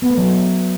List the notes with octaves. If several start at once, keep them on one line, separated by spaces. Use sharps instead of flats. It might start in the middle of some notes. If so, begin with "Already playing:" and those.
B3
A3
F#3